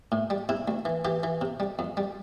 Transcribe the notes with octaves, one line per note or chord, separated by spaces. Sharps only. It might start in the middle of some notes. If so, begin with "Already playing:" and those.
A2
G3
C3 E4
D2
E3
E3 G4
E3
C3
G3
F2
G3